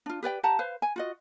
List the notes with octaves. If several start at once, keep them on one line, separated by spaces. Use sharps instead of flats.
D4 F4
G4 B4 D5 G5
G4 F#5 A5 A#5
B4 C5 F5
G#5
F4 F#4 D#5